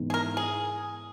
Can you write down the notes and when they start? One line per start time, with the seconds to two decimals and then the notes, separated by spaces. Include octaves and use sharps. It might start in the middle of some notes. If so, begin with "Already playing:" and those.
Already playing: G#2 E3 B3 D#4
0.10 G#4
0.14 A#4
0.37 G#4